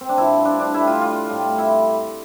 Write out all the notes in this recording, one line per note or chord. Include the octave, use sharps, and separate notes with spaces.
C4
D4
G2 F3 E4
D4
D4
A2 G3 E4
F4
F4
A2 G3
E4